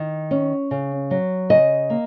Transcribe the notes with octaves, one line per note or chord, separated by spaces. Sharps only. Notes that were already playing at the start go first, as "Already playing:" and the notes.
Already playing: D#3
C#4
C#3
F#3
C#3 D#5
A#3